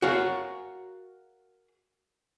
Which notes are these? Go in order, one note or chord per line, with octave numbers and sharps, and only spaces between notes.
F#4 G#4 A#4 C#5 F5